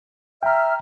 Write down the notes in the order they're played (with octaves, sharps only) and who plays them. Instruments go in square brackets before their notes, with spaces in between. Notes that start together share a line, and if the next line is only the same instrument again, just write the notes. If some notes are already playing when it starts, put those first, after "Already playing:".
[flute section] E5 F6 [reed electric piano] G5 A#5